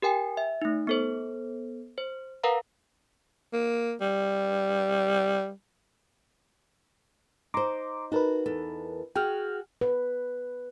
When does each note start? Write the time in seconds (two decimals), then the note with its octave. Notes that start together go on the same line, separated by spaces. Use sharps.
0.02 G4 A#4 G5 G#5
0.37 E5
0.62 A3 D#4
0.87 B3 A4 C5
1.98 C5
2.44 A#4 B4 F5 F#5 A#5
3.53 A#3
4.01 G3
7.54 D#4 C5 A#5 C6 D6
8.12 D#4 F#4 A#4 B4 A5
8.46 E2 A4
9.15 F#4 G#4 F#5 G5 F6
9.81 B4